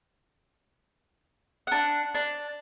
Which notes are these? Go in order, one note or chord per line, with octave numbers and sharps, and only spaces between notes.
D4 F#5
D4